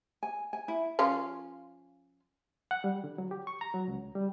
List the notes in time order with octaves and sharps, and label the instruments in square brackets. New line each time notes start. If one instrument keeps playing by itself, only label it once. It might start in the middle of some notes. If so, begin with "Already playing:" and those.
[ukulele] G#5
G#5
E4
[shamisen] F3 C#4 F4
[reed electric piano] F#5
G3
D3
F#3
G4
C#6
A#5
F#3
C#2
G3